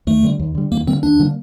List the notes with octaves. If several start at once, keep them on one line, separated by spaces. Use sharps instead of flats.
D#2 A3
D3 G3
D#2
D3 G3
D#2 A#3
D3 G3 A#3 C4
D#2 D4
D3 G3 A#3